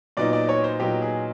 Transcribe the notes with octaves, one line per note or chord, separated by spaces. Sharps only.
A#2 F#3 B3 D#4 D5
D5
C#5
C5
A#2 F#3 B3 D#4 G4
G#4